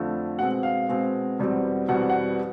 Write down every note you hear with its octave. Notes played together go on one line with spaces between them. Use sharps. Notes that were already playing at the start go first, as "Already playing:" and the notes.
Already playing: F2 D3 F3 A3
B2 G#3 C4 F#5
F5
B2 G#3 C4
E2 B2 G3 C4
E2 B2 G3 C4 F#5
F#5